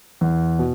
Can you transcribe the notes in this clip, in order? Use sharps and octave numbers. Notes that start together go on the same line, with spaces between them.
E2
B2